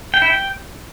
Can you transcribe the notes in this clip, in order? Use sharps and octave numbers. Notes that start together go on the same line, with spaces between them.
G5
E4
G5